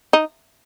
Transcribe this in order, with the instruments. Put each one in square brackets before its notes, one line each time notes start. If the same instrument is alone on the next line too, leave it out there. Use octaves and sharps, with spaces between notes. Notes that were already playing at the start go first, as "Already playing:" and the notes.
[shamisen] D#4